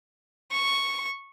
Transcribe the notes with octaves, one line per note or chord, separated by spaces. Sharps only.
C#6